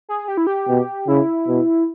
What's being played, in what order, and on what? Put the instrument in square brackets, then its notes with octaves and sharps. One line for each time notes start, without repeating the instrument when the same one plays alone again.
[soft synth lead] G#4
G4
E4
G4
[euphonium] B2
[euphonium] C#3 [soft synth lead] E4
[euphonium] B2